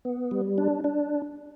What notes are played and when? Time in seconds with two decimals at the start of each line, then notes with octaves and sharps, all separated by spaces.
0.05 B3
0.31 G3
0.58 D4
0.84 D4